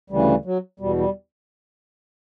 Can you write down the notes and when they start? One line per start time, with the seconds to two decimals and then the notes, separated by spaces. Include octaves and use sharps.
0.10 D2 C#3 E3 G3
0.45 F#3
0.80 E2 B2 G3
0.97 G3